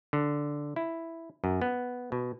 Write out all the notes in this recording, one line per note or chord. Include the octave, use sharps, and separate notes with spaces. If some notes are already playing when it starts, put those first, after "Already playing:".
D3
E4
F#2
B3
B2